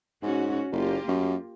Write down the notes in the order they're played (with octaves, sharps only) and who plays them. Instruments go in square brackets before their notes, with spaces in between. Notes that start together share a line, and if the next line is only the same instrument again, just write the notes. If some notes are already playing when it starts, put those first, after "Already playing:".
[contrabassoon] G#2 [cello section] C#4 F#4
[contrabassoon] F#1 [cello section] A#3 F4 G4
[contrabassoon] F#2